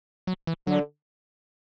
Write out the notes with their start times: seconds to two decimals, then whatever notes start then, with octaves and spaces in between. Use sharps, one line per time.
0.27 F#3
0.47 E3
0.67 D3 F#3